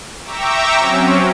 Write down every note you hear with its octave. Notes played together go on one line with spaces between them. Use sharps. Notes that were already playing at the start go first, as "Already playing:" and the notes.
E5 G5 A#5 C#6 D6 E6
F#3 C4 C#4